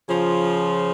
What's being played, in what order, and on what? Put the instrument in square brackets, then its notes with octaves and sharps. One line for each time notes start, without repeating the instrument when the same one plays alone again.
[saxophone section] C#3 F3